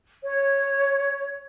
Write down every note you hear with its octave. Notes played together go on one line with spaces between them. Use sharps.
C#5